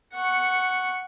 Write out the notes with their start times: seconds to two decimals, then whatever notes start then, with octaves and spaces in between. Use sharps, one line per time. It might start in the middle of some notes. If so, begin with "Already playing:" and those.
0.13 F#5 C#6